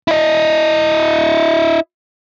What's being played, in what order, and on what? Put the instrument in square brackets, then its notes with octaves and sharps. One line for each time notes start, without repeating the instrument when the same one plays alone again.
[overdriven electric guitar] E4 D#5